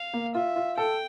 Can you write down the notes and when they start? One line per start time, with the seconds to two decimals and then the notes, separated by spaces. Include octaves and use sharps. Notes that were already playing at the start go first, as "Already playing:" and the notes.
Already playing: F5
0.13 A#3
0.35 F4 E5
0.56 F4
0.77 A4 G5